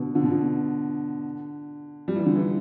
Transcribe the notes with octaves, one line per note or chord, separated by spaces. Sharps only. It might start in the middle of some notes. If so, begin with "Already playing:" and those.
Already playing: B2 D3
D3
B2
D3
G3
E3
D3
E3